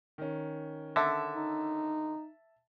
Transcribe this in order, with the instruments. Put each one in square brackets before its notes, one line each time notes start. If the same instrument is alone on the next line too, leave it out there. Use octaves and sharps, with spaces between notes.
[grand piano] D#3 C#4
[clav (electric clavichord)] D3 [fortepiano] E5 A5
[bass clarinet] D#4